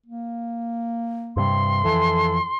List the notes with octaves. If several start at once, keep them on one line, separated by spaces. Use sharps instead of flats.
A#3
G2 C3 G3 C6
F2 E3 A4